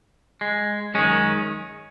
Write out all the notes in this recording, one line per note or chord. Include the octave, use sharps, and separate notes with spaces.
G#3
F#2 D#3 G#3 C#4